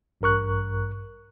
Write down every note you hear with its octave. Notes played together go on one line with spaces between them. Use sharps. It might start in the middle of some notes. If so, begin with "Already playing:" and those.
A1 G2 A#4 C#6 F#6